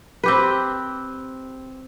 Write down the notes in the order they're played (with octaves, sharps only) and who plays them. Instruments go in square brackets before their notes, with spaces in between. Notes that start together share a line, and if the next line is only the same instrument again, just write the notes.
[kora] C4 G4 B4